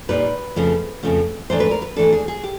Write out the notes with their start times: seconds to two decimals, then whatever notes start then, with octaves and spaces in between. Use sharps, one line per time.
0.09 A#2 G3 A#3 D#4 B4
0.56 F2 C#3 F3 A3 C#4
1.03 F2 C#3 F3 A3 C#4
1.50 G#2 E3 A3 D4 C5
1.60 B4
1.71 A#4
1.82 B4
1.96 G#2 E3 A3 D4 A4
2.13 G#4
2.28 G#4
2.43 G4